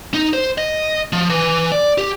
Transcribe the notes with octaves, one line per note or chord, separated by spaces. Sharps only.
D#4
C5
D#5
F3
E3
D5
G4